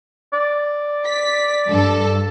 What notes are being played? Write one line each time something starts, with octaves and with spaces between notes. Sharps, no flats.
D5
B6
G2 A4